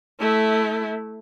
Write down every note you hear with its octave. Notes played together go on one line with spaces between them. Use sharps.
A3 E4